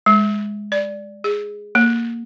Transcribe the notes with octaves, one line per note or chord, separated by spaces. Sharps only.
G#3
D5
G#4
A#3